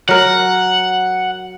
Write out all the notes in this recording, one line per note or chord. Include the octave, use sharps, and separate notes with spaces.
F#3 A#4 F#5